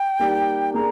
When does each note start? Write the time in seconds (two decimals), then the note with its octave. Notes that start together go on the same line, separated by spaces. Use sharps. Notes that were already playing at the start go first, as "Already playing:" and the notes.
Already playing: G5
0.19 G3 A#3 D#4 G4 D5
0.74 A#3 D4 G#4 A#5